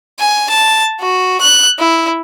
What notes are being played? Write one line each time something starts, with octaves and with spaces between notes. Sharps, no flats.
G#5
A5
F#4
F#6
E4